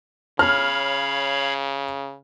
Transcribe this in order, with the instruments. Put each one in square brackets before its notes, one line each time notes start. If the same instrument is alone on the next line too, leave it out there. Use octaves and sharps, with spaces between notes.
[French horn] C#3 [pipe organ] C#5 F5 B5 [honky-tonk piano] F6